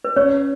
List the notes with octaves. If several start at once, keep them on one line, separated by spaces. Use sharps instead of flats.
B4
C#4 C#5